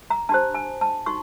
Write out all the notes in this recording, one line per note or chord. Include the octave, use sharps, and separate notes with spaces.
A#5
D4 G4 C5 A5
G#5
A5
D#4 F#4 C#6